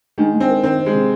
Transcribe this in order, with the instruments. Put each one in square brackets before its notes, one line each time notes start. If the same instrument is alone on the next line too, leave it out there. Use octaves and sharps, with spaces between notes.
[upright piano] D#3 [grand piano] G#3
[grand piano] G#3
[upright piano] C4
[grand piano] A#4
[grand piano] D#3 [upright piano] C4
[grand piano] C4
[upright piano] G#3
[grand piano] C3